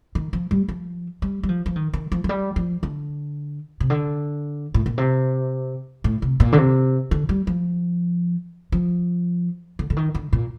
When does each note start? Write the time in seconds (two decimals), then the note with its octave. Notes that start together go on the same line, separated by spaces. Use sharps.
0.15 D#3
0.33 F3
0.51 G3
0.68 F3
1.22 G3
1.43 G3
1.49 F3
1.66 F3
1.76 D#3
1.93 D#3
2.12 F3
2.24 F3
2.29 G3
2.56 F3
2.83 D3
3.80 C3
3.90 D3
4.74 A2
4.86 A#2
4.98 C3
6.04 A2
6.22 C3
6.40 A#2
6.52 D3
6.58 C3
7.11 D3
7.29 G3
7.47 F3
8.72 F3
9.79 D3
9.90 D3
9.97 D#3
10.15 D3
10.33 A#2